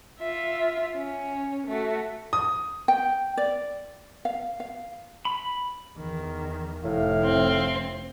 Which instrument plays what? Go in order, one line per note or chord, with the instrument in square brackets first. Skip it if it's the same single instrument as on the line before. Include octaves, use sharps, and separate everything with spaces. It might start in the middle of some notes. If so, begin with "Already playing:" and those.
[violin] F4 E5
C#4
A3 F#4
[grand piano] D#6
[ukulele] G5
D5
F5
F5
[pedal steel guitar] B5
[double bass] E2 D#3
[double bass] F1 [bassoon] A2 [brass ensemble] E4 F5
[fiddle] C4